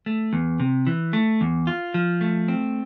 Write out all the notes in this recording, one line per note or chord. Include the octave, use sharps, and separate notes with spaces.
A3
E2
C3
E3
A3
E2
F4
F3
A3
C4